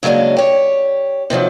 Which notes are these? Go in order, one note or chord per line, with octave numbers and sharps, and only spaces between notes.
C#3 F#3 G#3 A#3 D4
G4 C#5
C3 D#3 F3 F#3